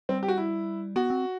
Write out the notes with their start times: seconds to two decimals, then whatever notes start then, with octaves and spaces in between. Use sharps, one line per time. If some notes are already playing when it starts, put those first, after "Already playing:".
0.09 G3 C4
0.23 G4
0.28 F#4
0.38 E4
0.96 B3 F#4
1.10 C4